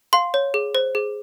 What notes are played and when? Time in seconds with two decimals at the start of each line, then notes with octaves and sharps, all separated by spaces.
0.13 F5 C6
0.34 C#5
0.54 G#4
0.75 C5
0.95 G#4